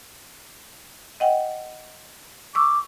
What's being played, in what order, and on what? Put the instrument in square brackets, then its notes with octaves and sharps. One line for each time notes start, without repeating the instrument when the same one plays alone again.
[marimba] D#5 F#5 G5
[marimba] C#6 E6 [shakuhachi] D6